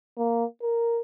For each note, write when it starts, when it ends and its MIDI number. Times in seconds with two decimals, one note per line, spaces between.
0.17 0.45 58
0.62 1.01 70